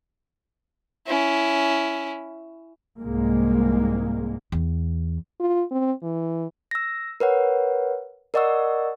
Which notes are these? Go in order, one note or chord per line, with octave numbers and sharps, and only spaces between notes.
C#4 E4
C2 G#2 G#3 A#3
E2
F4
C4
E3
E6 A#6
A#4 B4 C#5 F#5
A#4 D5 D#5 F#5 C#6 E6